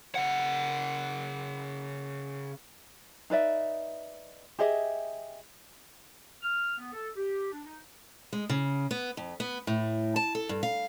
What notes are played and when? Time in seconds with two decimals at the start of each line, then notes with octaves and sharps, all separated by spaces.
0.15 C#3 F#5
3.30 D#4 B4 D5 E5
4.59 G4 G#4 D#5 E5
6.43 F6
6.78 B3
6.93 A4
7.16 G4
7.52 D4
7.64 D#4
8.33 G#3
8.50 C#3
8.91 B3
9.17 F2
9.40 B3
9.67 A2
10.16 A5
10.35 A4
10.49 G2
10.63 F5